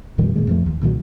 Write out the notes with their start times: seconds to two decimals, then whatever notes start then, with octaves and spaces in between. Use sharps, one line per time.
0.18 F2 A#2 D#3 G3
0.36 A#2 D#3 G#3
0.47 F2 F3 A3
0.66 D#2
0.81 C2 A#2 D#3 F#3